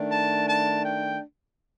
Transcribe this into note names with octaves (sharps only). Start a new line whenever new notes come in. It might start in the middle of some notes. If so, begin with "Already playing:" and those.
Already playing: D#3 A3 D4
A5
A5
G5